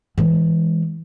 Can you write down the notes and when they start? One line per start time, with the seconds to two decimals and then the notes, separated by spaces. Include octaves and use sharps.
0.18 E3 G#3